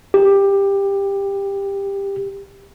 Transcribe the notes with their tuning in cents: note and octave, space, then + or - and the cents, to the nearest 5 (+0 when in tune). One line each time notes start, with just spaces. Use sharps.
G4 +15